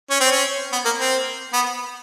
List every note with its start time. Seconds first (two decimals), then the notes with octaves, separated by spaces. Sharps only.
0.10 C#4
0.20 C4
0.31 C#4
0.72 B3
0.85 A#3
0.99 C4
1.53 B3